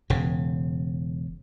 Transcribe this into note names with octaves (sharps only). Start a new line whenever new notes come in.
E1 C#3